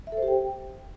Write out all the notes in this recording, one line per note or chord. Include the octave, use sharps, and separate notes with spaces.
E5
A4
C5
G4
G5